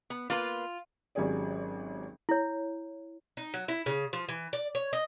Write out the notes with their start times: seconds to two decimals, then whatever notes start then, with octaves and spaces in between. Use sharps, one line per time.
0.10 B3
0.30 A#3 F4 B4
1.15 G#1 F#3 C#4 G4 G#4 D5
2.29 E4 C#5
3.37 D#4
3.54 F#3
3.68 E4
3.86 C#3
4.13 F3
4.29 E3
4.53 D5
4.75 C#5
4.93 D#5